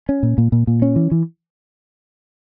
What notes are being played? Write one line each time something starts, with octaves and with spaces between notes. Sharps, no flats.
C#4
A#2
A#2
A#2
A#2
C#4
E3
E3